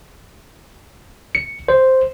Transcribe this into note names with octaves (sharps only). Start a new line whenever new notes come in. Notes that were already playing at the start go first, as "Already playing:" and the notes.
C#7
C5